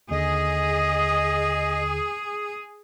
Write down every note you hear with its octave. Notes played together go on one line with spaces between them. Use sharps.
D#2 D3 G#4 D#5